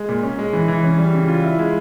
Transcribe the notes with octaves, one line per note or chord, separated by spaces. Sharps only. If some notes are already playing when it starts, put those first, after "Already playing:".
Already playing: G#3
A#2
C#4
G#3
E3
E3
C#4
G3
C#3
F4
E4
G#3